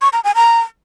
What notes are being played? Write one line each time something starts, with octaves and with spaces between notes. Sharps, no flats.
C#6
A#5
G#5
A#5